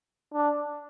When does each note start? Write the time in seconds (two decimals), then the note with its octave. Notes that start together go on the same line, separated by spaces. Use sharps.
0.34 D4